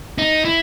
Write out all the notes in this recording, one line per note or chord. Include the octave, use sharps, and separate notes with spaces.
D#4
E4